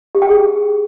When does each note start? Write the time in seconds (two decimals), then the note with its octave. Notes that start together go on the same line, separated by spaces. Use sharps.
0.15 G4
0.22 G5
0.29 G#4